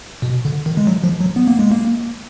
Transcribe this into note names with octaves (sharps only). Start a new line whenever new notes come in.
B2
D3
D#3
G#3
F#3
F3
F#3
B3
A#3
G#3
A#3